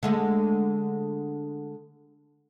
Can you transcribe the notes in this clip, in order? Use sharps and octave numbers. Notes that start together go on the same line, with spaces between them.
D3 G#3 A3